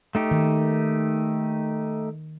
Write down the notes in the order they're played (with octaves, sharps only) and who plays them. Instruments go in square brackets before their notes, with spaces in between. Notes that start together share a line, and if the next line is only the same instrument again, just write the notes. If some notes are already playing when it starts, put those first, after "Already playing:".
[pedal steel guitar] A3 D#4 G4
[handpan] D#3